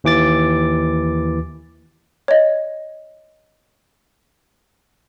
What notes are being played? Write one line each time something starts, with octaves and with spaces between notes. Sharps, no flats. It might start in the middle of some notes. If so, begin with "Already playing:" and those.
D#2 E3 D6 A6
C#5 D#5